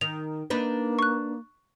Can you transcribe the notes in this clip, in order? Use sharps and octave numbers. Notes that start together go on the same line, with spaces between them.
D#3 F7
A#3 D4 D#4 B4
C#6 F#6